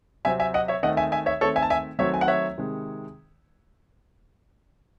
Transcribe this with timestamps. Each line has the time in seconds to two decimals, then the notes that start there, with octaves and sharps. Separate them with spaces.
0.25 C3 F#3 C4 E5 G#5
0.40 E5 G#5
0.54 D#5 F#5
0.68 C#5 E5
0.83 D#3 A3 C4 D#5 F#5
0.97 E5 G#5
1.12 E5 G#5
1.26 C#5 E5
1.41 D#3 A3 C4 A4 C#5
1.56 E5 G#5
1.63 A5
1.70 E5 G#5
1.99 D#3 F#3 A3 C4 C#5 E5
2.14 G#5
2.21 F#5
2.28 C#5 E5
2.58 C3 D#3 G#3